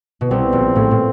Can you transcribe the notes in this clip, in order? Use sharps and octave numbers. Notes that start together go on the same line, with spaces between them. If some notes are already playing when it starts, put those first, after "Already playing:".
B2
C2 C3 C4
A#1 A#2
A1 A2
A#2